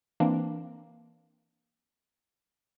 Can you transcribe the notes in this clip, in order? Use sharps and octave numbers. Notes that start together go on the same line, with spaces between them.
E3 A#3 C4 D4